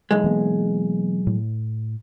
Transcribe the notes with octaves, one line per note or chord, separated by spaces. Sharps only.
B1 E2 G#3
E3 A#3 B3
A2